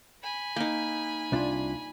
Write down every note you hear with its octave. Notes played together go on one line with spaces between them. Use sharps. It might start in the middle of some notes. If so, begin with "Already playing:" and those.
G#5 B5
A#3 D#4
C2 D4 F4